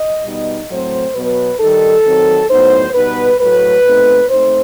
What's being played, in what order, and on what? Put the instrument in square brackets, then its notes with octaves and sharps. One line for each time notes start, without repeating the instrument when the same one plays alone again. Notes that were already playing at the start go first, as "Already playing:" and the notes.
Already playing: [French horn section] D#5
B2 G3 B3 D#4
A2 F#3 A3 C4 C5
B2 F#3 B3 B4
D#3 G3 D#4 A4
D#3 F#3 C4
A2 F#3 B3 D#4 C5
B2 G3 B3 D#4 B4
A2 F#3 A3 B4
B2 A3 C4 D#4
A3 C4 D#4 C5